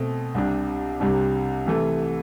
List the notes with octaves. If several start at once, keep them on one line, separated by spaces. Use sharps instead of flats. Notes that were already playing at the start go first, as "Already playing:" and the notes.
Already playing: B2 A3 C4
C2 C3 G3 D4
C2 C3 G3 D4
C3 E3 A3